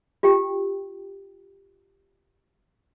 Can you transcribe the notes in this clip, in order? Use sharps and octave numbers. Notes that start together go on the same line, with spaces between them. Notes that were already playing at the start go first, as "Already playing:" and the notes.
F4 G4 G5